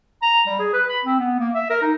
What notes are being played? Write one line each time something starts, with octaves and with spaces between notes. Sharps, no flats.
A#5
G3
G#4
B4
B5
C4
B3
A#3
E5
A#4
D#4